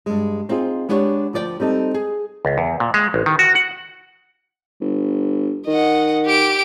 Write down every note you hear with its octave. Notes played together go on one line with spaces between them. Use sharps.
G2 G#3
C4 D#4 F4 G#4
G#3 B3 D4 G4 B4 C#5
D2 F3 D5 E5 G5
G3 C4 D#4 A4
G#4
C#2
E2
A#2
G#3
A1
D#3
F#4
F#5
G1
D#3 D#5 F#5
G4 D7